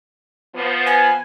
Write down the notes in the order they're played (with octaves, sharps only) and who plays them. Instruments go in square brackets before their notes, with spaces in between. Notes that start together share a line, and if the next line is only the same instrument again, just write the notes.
[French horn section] F3 B3
[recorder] G#5